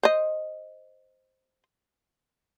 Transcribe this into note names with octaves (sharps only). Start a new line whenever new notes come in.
C5 D#5